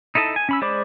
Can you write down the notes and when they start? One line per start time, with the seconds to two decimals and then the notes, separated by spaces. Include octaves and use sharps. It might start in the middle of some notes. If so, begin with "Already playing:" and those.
0.15 D#4 E4 A4 D#5 A5
0.36 G#5
0.49 C#4 B5 E6
0.61 G#3 C5 D5 B5 D6